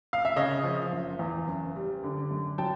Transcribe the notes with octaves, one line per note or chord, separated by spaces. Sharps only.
F5
E5
C#3 C#5 D#5
F3
F#1
E2
F#1
G3
D3
F#2
F#3 G5 A5